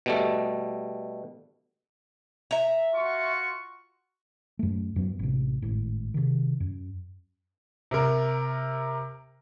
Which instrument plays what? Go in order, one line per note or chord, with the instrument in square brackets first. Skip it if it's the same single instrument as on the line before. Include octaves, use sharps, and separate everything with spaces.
[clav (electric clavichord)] B2 G3 A3
[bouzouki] E5 A#5
[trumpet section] F4 F#4 C#6
[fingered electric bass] F#2 A3
F#2 F#3 B3
A1 C3
G#1 A2
C3 D#3
F#2
[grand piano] C3 A#4